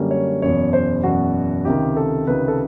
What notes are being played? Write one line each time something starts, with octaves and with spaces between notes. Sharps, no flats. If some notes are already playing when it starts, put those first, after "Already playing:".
Already playing: F#2 D3 G3 A#3
C#5
F#1 E2 B2 C#5
C5
F#1 E2 B2 F#4
C#2 C3 D#3 G4
A4
C#2 C3 D#3 B4
A4